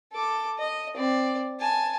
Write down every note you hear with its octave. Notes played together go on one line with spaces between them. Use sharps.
A4 D6
D#5
C4 D5
G#5 A5